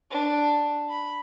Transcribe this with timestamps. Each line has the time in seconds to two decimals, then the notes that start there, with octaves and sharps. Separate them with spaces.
0.11 D4
0.89 B5